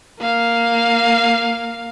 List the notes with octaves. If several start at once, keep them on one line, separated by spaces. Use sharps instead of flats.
A#3 F5